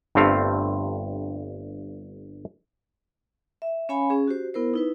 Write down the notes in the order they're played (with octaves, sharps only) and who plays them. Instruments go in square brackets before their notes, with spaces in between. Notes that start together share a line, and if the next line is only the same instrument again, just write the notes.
[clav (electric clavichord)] G1 G2 A3 C4 F5
[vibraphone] E5
C#4 C#5 F5 G#5 B5
C#4 G#4
F#4 G4 C5
B3 E4 A#4 C5
D#4 E4 B4